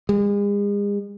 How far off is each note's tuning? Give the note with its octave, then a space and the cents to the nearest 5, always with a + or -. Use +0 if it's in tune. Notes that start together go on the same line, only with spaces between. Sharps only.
G#3 -40